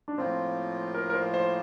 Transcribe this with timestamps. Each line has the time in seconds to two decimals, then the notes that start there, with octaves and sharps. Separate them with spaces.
0.08 D4
0.17 A2 F3 A#3 C4 F4
0.94 A#4
1.10 A#4
1.15 C5
1.34 C5